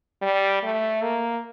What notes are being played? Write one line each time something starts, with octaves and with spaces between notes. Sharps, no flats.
G3
A3
A#3